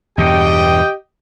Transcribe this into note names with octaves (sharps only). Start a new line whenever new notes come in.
E2 G2 B2 G4 D#5 G5